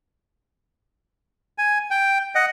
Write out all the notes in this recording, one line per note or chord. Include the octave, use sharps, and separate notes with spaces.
G#5
G5
D#5 F#5